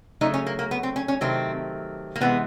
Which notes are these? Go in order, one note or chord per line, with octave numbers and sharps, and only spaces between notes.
C#3 F#3 A3 D#4
C#4
A#3
A#3
B3
C4
C#4
C#4
C3 D#3 F#3 A3 C4
A#3
C3 E3 G#3 B3